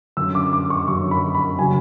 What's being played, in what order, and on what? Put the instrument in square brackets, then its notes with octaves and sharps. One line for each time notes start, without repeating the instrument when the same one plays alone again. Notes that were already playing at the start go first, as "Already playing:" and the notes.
[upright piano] F#2 D3 F#3 C#4 E6
D6
D6
C#6
F#2 D3 F#3 C#4 C#6
B5
B5
C#3 F#3 G#5